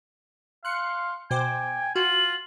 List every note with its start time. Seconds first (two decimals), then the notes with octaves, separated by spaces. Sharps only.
0.65 F5 C6 F#6 C#7
1.31 B2 C5 G5 G#5 D6
1.96 F4 F#4 F#7